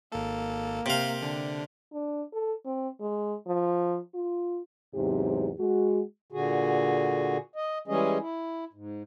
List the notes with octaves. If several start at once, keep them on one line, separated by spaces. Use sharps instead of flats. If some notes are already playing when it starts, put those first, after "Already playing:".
G#1 A#3 A4
C3 F5
D3 D4
D4
A4
C4
G#3
F3
F4
E2 G#2 C3 F#3 G4
G#3 F#4
A#2 D3 F#4 G#4
D#5
E3 G3 G#3 C#4 G#4 D#5
E4
G#2